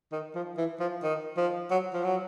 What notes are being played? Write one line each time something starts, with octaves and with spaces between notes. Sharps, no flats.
D#3
F3
E3
F3
D#3
F3
F#3
F3
F#3